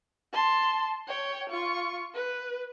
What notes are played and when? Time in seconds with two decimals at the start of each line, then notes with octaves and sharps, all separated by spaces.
0.33 A5 C6
1.08 C#5 G5
1.50 F4 C#6
2.15 B4